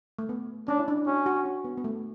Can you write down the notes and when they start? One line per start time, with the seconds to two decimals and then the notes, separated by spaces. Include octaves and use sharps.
0.19 A3
0.29 B3
0.68 C#4 D4
0.79 E4
0.88 D4
1.06 C#4 F#4
1.26 F#4
1.45 F#4
1.65 B3
1.77 B3
1.84 A3